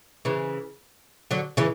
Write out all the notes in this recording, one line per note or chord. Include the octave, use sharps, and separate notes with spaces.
C#3 E3
D3 F#3
C#3 E3